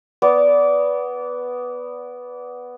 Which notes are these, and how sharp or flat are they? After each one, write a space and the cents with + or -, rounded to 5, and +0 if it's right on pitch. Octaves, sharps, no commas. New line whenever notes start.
B3 +0 D5 -20